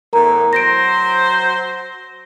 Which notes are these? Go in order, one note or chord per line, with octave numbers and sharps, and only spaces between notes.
E2 A2 E3 A#4 A#5
F#3 C5 A#6 D7